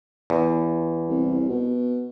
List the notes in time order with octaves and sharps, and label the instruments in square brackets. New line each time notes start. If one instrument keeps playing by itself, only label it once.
[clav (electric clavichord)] E2
[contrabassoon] C2
B2